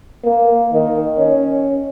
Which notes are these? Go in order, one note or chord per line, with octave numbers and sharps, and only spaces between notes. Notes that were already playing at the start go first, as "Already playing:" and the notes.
A#3
D#3
C#4